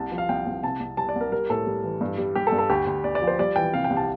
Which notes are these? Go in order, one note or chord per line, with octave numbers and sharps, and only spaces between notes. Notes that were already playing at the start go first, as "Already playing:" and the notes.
Already playing: C2 A5
F3
F5
C2 G5
C2
C3 A5
C2
G3 A5
D5
C2 A#4
G3 A#4
A2 A4
G3
E3
G2
G3
G3 G4
A4
G2
A4
D2 G4
D2
D2 D5
D5
F3
C5
G3 D5
E3 G5
C3 F5
G5
C2
A5